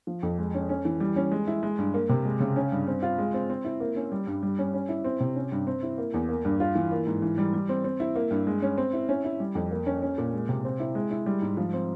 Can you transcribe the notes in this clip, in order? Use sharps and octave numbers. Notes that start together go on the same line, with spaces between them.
F3
F2
G#3
C#4
C#4
E3
G3
C#4
G#3
E4
G#3
G2
A#3
C3
G#3
C#3
C#4
G2
C4
F4
G#3
C4
C4
E4
A#3
C#4
G3
G2
G3
C#4
C#4
E4
C4
C3
C#4
G2
C4
E4
A#3
E2
A#3
G2
F4
E3
A#3
G#2
E3
G3
G3
C4
C4
E4
A#3
G2
G#3
C#4
C4
E4
C#4
E4
G3
F2
A#3
C#4
C#4
A#2
G#3
C3
C4
E4
G#3
E4
G3
G#2
F3
C4